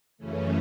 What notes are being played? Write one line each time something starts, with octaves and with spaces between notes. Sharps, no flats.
F#2 C#3 E3 A3 C#4